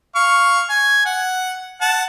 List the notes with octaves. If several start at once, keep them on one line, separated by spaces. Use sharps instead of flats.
F5 C#6
G#5
F#5
F#5 A5